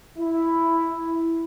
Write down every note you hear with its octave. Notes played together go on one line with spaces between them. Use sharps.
E4